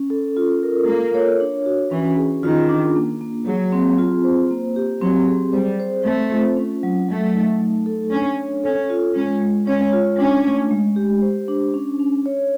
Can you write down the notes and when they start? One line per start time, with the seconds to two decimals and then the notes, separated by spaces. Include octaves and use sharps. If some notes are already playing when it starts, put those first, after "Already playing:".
Already playing: C#4
0.10 A4
0.37 F4
0.63 A#4
0.88 A#3 A4
1.14 C#5
1.40 D4
1.66 F#4
1.91 E3 C#4
2.17 G#4
2.43 D#3 F4
2.69 D4
2.95 A#3
3.21 A#3
3.47 F#3 G#4
3.73 C4
3.98 F4
4.24 C5
4.51 A#3
4.76 G4
5.02 F#3 C4
5.28 G#4
5.53 G3 C5
5.80 C5
6.05 A3 C4
6.31 F4
6.57 C#4
6.83 F#3
7.08 F#3 A3
7.34 D#4
7.61 A3
7.86 A4
8.12 C#4 D4
8.37 C#5
8.64 C#4 A4
8.90 F4
9.15 G#3 C#4
9.41 G#3
9.67 C#4 C#5
9.93 F4
10.19 C#4 D4
10.45 A3
10.70 G#3
10.96 G4
11.22 C5
11.48 D4
11.74 C#4
12.00 C#4
12.26 C#5